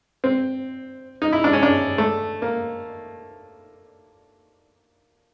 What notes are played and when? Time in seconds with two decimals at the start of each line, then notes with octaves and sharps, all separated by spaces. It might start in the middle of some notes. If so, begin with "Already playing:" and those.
0.24 C4
1.22 D#4
1.32 E4
1.44 D4
1.53 C#4
1.63 D4
1.98 A3
2.42 A#3